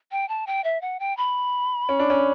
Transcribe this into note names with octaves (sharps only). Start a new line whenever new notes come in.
G5
A5
G5
E5
F#5
G5
B5
C#4
D4
C#4